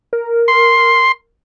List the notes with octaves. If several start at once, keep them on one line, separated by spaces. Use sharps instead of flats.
A#4
C6